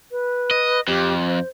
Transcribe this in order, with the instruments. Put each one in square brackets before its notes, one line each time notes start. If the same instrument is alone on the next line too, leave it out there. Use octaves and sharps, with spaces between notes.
[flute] B4
[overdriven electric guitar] D#5
[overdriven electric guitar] F2 [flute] G4
[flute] C5